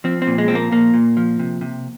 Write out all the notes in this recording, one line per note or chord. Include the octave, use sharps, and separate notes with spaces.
F3 C4
C4
A#2
G#3
F3 C4
A#3
A#2 A#3
A#2
F3
C3
C3